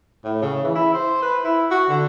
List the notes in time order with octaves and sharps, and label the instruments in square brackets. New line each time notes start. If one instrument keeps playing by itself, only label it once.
[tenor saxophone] A2
C#3
E3
E4
C5
B4
E4
F#4
D3